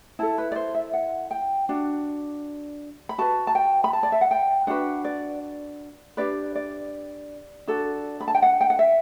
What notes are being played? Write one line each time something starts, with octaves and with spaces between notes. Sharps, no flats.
E4 A4 A5
B4
D5
C5
E5
F#5
G5
D4 F#4
B5
F#4 B4 A5
A5
G5
B5
A5
D5
E5
F#5
G5
D4 F#4 B4 F#5
D5
D4 G4 B4 D5
D5
D4 F#4 A4
B5
A5
G5
F#5
G5
F#5
E5